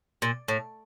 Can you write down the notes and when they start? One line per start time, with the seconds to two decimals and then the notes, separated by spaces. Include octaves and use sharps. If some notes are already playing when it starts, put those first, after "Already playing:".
0.22 A#2
0.48 A2